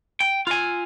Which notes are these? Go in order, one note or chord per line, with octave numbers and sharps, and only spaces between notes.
G5
F4 G#5